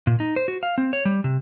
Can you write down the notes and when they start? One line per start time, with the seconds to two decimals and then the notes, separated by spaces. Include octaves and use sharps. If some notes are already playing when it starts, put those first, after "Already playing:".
0.07 A#2
0.20 D#4
0.36 C5
0.48 F#4
0.63 F5
0.78 C4
0.93 C#5
1.05 G3
1.24 C3